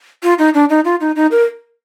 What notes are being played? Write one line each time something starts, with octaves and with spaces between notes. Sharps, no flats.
F4
D#4
D4
D#4
F4
D#4
D#4
A#4